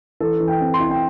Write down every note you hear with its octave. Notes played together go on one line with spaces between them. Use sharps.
E3 A4
E3
G5
C4
C6
E4
G5